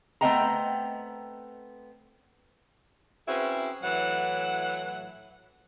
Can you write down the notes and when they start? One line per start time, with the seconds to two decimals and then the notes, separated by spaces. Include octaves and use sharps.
0.21 A3 B3 C4 D#5 G5 A#5
3.28 C4 C#4 E4 F#4 G#4 B4
3.83 A2 E3 F#3 F#5